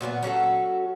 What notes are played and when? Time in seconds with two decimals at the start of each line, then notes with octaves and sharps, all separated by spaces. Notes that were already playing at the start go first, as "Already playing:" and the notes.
0.01 A#2 F#3 A3 B3
0.23 F#3 C#4 F#4 A4